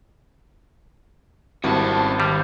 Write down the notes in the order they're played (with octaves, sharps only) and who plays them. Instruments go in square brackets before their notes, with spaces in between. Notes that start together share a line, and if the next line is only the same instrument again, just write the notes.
[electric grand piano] G#1 G2 [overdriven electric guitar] C#3 A5 [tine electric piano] C4 E4 F#4
[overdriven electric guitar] D#2 [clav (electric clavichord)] G3